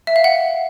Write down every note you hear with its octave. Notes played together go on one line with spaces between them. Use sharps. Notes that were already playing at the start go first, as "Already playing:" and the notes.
E5
F5
F#5